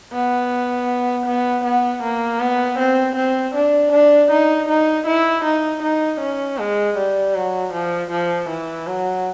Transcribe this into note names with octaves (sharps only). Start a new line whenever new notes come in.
B3
B3
B3
A#3
B3
C4
C4
D4
D4
D#4
D#4
E4
D#4
D#4
C#4
G#3
G3
F#3
F3
F3
E3
F#3